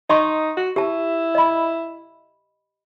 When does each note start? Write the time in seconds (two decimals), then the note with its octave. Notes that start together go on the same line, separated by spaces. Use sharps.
0.10 D#4 D#5 C6 C#6
0.57 F#4
0.76 E4 G4 A5
1.35 D#5 B5